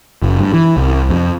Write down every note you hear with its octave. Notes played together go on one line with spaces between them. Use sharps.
F#1
G2
E3
C2
F2